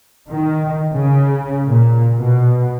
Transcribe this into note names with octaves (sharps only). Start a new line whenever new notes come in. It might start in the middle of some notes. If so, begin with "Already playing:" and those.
D#3
C#3
A#2
B2